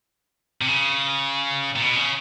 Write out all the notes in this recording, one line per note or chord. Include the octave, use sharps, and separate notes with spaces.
C3
C#3
A#2
B2
C#3